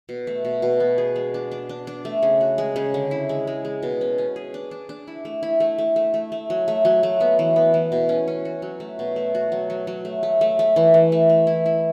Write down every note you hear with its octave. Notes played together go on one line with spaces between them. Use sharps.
B2
A3
B2
B2
B3
G#4
G#3
D4
D4
D4
D4
A3
C#3
F#4
G#3
C#3
D3
E4
G#3
G#3
G#3
B2
C#4
C#4
G#4
D4
D4
D4
E4
A3
E4
A3
A3
A3
A3
A3
F#3
A3
F#3
A3
B3
E3
B3
E3
B2
C#4
C#4
F#4
F#3
A3
B2
A3
F#4
F#3
F#3
F#3
A3
A3
A3
A3
E3
E3
A3
A3
E4
E4